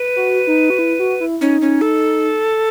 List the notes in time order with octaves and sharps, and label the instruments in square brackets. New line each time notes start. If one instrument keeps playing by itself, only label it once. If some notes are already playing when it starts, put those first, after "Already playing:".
Already playing: [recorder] B4
[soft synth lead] F#4
D#4
F#4
E4
F#4
E4
[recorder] C#4 [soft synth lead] D#4
[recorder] C#4
A4